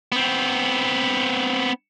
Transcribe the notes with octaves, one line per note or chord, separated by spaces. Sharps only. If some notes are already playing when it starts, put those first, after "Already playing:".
B3 C4